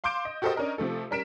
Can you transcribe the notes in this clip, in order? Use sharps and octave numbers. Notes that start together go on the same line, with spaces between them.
F5 C6 D6 G6 D7 E7
D#5
F#4 G4 A4 A#4 C5 D#5
C#4 D4 A#4 D#5
C3 F3 A3 A4
G3 C#4 A#4 B6 D7 E7